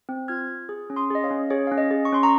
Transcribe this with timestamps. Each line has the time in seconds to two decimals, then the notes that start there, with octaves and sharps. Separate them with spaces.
0.09 C4
0.28 F4 F6 G#6
0.49 F4
0.69 G#4
0.90 C#4
0.96 C6 D#6
1.10 G#4 D#5
1.24 C#5 F5
1.31 C#4
1.50 G#4 C#5
1.67 C#4 F5
1.78 D#5
1.91 G#4
2.05 C#6
2.12 C#4 C6
2.23 A#5 C#6